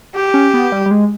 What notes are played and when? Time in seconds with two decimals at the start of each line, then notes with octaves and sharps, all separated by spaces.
0.15 G4
0.34 C#4
0.54 B3
0.72 G3
0.86 G3
0.91 G#3